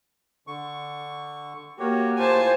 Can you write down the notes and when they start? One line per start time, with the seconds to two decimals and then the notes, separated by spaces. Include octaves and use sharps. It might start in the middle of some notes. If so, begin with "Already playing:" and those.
0.47 D3 C#6
1.80 A#3 F#4 G4 C#5
2.19 A2 F4 C5 G#5 A5